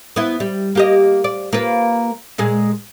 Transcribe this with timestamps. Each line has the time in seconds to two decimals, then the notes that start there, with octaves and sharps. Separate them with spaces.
0.16 B3 E4
0.40 G3
0.75 A#3 G4 D#5
1.24 D5
1.53 A#3 F4 B4
2.38 A#2 G#3 G#4